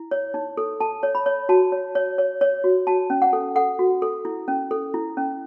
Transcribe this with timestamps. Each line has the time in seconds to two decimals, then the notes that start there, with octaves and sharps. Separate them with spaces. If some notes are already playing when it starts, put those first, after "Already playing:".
Already playing: E4
0.11 C#5
0.34 D#4
0.57 A4
0.80 A4 A5
1.03 C#5
1.15 B5
1.26 C#5
1.49 F#4 A5
1.72 C#5
1.95 C#5
2.18 C#5
2.41 C#5
2.64 F#4
2.87 F#4 A5
3.10 C#4
3.22 F#5
3.33 A4
3.56 A4 F#5
3.79 F#4
4.02 A4
4.25 E4
4.48 C#4
4.71 A4
4.94 E4
5.17 C#4